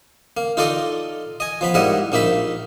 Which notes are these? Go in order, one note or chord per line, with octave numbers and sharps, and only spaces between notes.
A#3
D#4 F4 A4 D5 D#5
D#5 G#5
F3 B3 B5
G#2 G3 A#3 E4 D#5 F#5
A#1 A#3 D#4 E5 B5